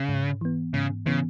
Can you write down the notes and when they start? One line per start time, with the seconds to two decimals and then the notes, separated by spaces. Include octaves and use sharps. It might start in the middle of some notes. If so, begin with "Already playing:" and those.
Already playing: C#3
0.09 G#2
0.41 E3 B3
0.74 G#2 C#3
1.06 C#3 E3 B3